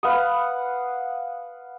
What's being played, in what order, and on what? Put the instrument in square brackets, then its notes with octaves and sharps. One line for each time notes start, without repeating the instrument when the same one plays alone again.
[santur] B4 F5 F#5 D#6